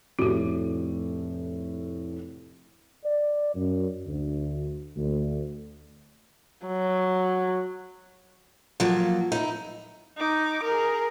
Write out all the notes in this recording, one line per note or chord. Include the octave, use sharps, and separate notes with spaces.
F1 A2 F#4 G4
D5
F#2
D2
D2
F#3
F3 F#3 A#3
D#4 E4
D#4 D6
G#4 A#4